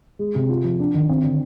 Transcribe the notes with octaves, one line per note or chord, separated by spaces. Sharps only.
G#3
C3
F4
F3
D4
D#3
C4
D3